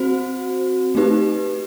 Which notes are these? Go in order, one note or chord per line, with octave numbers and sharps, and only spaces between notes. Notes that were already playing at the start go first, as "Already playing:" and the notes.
Already playing: C4 F#4 C5
A3 D#4 G4 B4